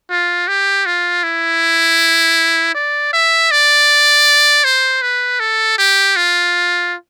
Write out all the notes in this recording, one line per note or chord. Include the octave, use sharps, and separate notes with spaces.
F4
G4
F4
E4
D5
E5
D5
C5
B4
A4
G4
F4